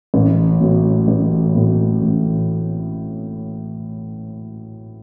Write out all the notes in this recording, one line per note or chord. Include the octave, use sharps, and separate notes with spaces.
A1
A2 F#3
A1
A2 F#3
A1